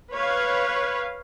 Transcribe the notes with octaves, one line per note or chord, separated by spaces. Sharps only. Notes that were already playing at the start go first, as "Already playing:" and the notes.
B4 C#5 F5